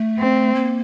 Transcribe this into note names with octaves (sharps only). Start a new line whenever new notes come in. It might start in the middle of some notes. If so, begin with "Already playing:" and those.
Already playing: A3
C4
A#3